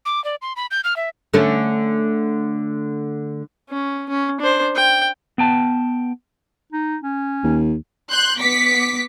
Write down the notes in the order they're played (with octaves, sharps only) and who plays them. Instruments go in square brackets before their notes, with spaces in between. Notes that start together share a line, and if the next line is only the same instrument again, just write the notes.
[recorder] D6
D5
C6
B5
G6
F6
E5
[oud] D3 A3 C#4
[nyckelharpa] C#4
C#4
D4 C5
G5
[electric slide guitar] B3 G5 A5
[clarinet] D#4
C#4
[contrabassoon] D#2
[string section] C6 F#6 G6
B3 D6 B6 C#7